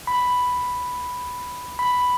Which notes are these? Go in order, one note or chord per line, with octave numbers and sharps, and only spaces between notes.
B5
B5